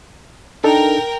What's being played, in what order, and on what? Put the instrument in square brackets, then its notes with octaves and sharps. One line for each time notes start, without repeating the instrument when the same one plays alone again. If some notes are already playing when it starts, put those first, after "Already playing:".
[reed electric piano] D4 D#4 A4 [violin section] A#4 G5